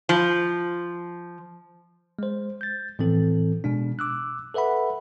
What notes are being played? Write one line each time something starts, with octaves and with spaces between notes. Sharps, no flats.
F3
G#3 C5
G6 A6
A2 E3 F3 C4 A4
B2 G#3 D4
D6 E6 F#6
A4 B4 E5 F#5 B5